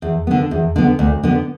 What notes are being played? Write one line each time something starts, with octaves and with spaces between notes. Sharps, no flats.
E2
D3 B3
E2
D3 B3
D2
D3 B3